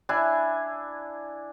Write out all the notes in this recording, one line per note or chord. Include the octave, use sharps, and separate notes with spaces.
D4 E4 G#5